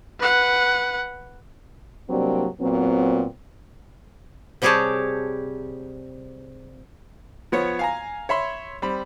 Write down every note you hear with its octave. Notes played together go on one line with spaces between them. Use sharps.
B4 F#5
C3 F#3 G3 A#3 C4 D4
A#2 F#3 B3 C4
C3 G3 G4 G#4 C#5 A5
F3 B3 C#5
F5 G#5 A#5
C#5 E5 B5 C6
G3 C4 B5